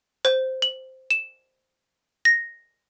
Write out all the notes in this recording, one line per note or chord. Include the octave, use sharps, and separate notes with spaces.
C5
F#7
E7
A#6